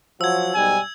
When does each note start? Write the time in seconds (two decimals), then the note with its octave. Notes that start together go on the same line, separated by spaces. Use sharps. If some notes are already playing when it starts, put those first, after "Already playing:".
0.21 F3 F#3 E6 G#6
0.54 B1 G#2 G3 G#5